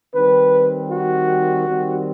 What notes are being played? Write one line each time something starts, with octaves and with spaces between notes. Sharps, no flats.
D#3 G3 C4 B4
F#4
D#3 G3 C4